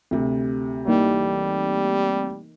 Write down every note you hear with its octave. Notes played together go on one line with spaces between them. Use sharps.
D2 C3
E3 G3 A#3 D#4